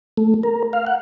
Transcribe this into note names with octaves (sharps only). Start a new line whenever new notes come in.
A3
A#4
F5
F#5